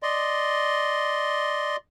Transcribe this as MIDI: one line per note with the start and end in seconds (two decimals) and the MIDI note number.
0.03 1.76 74
0.03 1.76 75
0.03 1.76 84